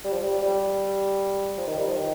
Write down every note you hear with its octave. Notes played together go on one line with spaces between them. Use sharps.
G3
F3
G3
G3
F3
D#3
G3
F3
D#3